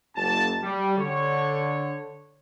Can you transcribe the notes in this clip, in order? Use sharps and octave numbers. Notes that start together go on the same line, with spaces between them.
F#1 A5
G3
D3 C#5